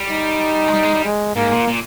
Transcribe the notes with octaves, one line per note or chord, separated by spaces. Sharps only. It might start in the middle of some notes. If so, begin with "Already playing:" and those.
Already playing: G3
D#4
G#3
G3
G#3
G3
G#3
G#2 A#3
A#2
A#2